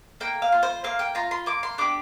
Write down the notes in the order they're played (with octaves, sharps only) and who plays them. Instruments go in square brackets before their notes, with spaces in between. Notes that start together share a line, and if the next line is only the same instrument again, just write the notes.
[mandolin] A#3 G5
F5
F4
C5
A#3 F5
G5
F4 A#5
C6
A#3 D6
C6
D4 G4 D6